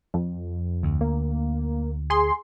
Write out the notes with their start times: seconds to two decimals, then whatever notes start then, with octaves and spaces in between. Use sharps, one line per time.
0.14 F2
0.83 D2
1.01 A#3
2.10 G#4 C6